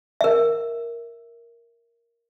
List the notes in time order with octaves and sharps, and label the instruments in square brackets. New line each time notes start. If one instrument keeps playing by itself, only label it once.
[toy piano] A#4 E5